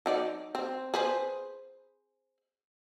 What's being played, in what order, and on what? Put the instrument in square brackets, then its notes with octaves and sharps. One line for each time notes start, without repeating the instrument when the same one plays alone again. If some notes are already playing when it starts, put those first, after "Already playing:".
[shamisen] F#3 D#4 D5
C4
G#4 B4 C5